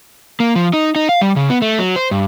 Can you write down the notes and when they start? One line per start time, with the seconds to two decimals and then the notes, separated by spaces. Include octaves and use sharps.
0.40 A#3
0.55 F3
0.73 D#4
0.96 D#4
1.09 F5
1.21 G3
1.36 C#3
1.50 B3
1.62 A3
1.79 F#3
1.96 C5
2.11 G2